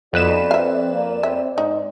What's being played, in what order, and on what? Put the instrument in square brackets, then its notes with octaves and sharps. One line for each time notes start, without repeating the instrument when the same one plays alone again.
[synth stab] F2 B4 E7 [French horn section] B3 D#4 F#4 [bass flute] D5
[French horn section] C4 [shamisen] E5 F5
[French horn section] A#3
[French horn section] C4 [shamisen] E5
[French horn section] G#2 [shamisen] D#4